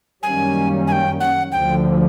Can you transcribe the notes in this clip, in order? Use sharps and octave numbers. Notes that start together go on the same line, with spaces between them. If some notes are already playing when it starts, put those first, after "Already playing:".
F#2 D#3 G3 A#3 C#4 G#5
G#5
G5
F#5
D2 D3 F3 G5